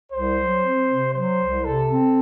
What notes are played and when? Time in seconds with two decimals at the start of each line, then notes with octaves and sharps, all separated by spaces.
0.11 C2 C5
0.38 F#3
0.63 C4
0.88 C3
1.14 F#3 C5
1.40 C2
1.64 C3 A4
1.90 C4